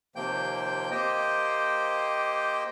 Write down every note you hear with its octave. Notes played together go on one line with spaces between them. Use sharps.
D#2 C3 F3 A#3 G5 G6
A#3 G4 C5 D#5 G5